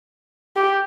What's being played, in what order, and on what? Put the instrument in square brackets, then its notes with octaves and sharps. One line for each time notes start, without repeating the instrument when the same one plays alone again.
[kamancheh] G4